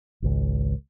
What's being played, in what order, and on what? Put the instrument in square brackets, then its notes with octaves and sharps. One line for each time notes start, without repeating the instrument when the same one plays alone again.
[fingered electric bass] G#1 C#2